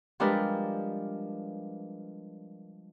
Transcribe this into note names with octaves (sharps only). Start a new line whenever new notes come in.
F3 G3 G#3 D4 A#4 B4